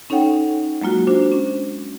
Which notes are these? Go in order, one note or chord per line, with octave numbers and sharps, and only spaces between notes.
C#4 D#4 A4 C#5 F#5 G5
F#3 G#3 A#3 F4 F#4
D4 F#4 C5
C#4